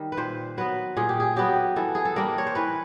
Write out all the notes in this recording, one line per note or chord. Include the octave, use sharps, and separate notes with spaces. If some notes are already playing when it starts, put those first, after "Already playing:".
Already playing: D#3 G3
B4
A#2 C5
F#3 B3 B4
A#2 G#4
G4
G#4
F#3 B3 G4
E3 A4
G#4
A4
G3 A#3 D4 A#4
C#5
C5
E3 B4